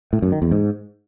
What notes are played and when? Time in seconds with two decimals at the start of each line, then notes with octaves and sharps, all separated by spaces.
0.13 A2
0.22 F#2
0.32 D#3
0.42 E2
0.51 G#2